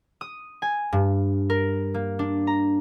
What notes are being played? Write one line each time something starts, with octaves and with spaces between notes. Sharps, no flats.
D#6
G#5
G2
A#4
A#3
D4
A#5